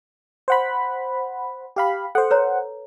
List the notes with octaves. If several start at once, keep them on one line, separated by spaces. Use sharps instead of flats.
C5 F#5 B5
G4 F5 B5
A4 C5 F#5
B4 C#5 A#5